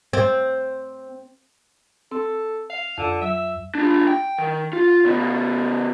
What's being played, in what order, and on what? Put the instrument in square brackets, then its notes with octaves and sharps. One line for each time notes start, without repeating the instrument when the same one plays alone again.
[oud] C4
[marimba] C4 [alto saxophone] A4
[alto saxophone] F5
[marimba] F2 [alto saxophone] D3
[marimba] F#3 [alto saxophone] E5
[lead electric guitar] D4 F4
G5
D#3
F4
C#3 B3